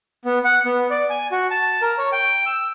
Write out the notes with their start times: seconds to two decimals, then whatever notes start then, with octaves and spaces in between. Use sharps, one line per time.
0.25 B3
0.45 F#5
0.65 B3
0.90 D5
1.10 G#5
1.32 F#4
1.51 A5
1.82 A#4
1.98 C#5
2.12 G5
2.46 E6